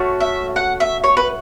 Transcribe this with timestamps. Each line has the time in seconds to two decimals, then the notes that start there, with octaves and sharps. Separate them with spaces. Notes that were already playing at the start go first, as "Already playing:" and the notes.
Already playing: A3 C#4 F#4
0.20 E5
0.56 F#5
0.80 E5
1.04 C#5
1.17 B4